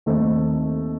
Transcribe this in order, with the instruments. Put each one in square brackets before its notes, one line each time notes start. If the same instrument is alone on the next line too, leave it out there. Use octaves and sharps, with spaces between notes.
[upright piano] D#2 D#3 A3 C4